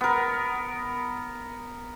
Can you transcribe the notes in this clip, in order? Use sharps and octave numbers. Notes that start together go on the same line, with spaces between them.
B3 A#4